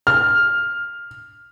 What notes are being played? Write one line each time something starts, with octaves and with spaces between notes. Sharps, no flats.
F6